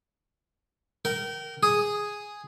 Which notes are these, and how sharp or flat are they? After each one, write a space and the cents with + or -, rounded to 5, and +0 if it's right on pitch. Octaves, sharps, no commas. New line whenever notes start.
A#4 +0 G5 -30
G#4 +0 D#6 +0